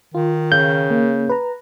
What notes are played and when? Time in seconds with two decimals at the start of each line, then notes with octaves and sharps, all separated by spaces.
0.14 D#3 F4
0.52 C#3 F5 G6
0.90 A#3
1.29 B4 A#5